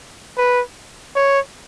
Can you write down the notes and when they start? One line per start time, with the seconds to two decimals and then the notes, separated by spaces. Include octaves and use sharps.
0.38 B4
1.16 C#5